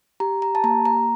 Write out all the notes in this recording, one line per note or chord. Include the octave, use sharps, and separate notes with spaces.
G4 A#5
A#5
A5
A#3 A#5
A#5